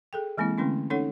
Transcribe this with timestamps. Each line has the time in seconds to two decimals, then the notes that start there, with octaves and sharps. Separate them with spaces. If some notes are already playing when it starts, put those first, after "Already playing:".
0.13 G#4 A4 G5
0.38 E3 G#3 A#3 C4 E4
0.58 D3 G#3 A3 C4 C#4 E4
0.90 C#4 D#4 A4 C#5 F#5